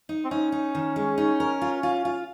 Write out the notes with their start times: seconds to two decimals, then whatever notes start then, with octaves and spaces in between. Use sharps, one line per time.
0.09 D#4
0.25 C4
0.30 C#4 D#4
0.52 D#4
0.75 D#3
0.96 G#3
1.18 D#4
1.40 A#4
1.61 F4
1.83 F4
2.05 F4